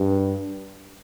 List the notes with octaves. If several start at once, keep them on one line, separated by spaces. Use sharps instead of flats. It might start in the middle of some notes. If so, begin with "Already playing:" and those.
Already playing: G2